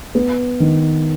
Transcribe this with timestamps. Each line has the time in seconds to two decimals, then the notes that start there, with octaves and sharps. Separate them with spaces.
0.15 B3
0.60 D#3